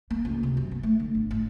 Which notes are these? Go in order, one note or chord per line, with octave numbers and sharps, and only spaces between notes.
A#3
C#2
C3
F#2
B3
A3
D3
G1
A2